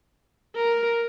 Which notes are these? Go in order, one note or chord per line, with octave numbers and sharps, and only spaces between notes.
A#4